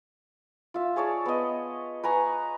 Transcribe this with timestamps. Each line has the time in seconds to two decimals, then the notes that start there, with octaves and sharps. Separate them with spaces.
0.74 F4 E5
0.96 G#4 C#5 D5 A5
1.26 B3 D#5
2.03 B4 G#5 A#5 C#6